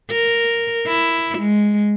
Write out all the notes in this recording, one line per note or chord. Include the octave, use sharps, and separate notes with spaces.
A#4
E4
G#3